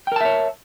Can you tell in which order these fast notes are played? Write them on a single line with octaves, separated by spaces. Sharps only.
G5 A#4 A5 E5 C#5